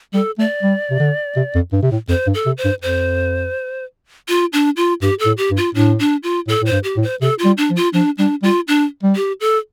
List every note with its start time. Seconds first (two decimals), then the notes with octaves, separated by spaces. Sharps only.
0.14 G3 A4
0.38 A3 D5
0.63 G3
0.91 C3
1.00 D3
1.36 C3
1.55 F2
1.73 G2
1.83 C3
1.91 A2
2.09 F2 C5
2.27 G2
2.34 A4
2.46 C3
2.58 C5
2.65 G2
2.82 F2 C5
4.28 F4
4.53 D4
4.77 F4
5.02 G2 G4
5.19 A4
5.26 A2
5.38 G4
5.51 G2
5.57 F4
5.75 A2 D4
5.99 D4
6.23 F4
6.47 A2 A4
6.62 A2 C5
6.72 G2
6.84 G4
6.97 A2
7.03 C5
7.21 C3 A4
7.39 F4
7.45 G3
7.57 D4
7.70 F3
7.76 F4
7.93 F3 D4
8.18 G3 D4
8.43 G3 F4
8.68 D4
9.03 G3
9.15 G4
9.41 A4